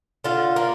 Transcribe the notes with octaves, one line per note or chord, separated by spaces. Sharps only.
D3 F4
A#3